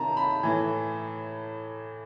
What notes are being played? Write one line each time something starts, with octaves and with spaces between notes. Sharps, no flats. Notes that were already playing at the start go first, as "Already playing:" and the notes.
Already playing: C3 D#3 A5 A#5
B5
A2 E3